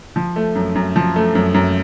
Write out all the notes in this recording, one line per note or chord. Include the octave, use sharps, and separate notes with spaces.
F3
A3
F#2
F#2
F3
A3
F#2
F#2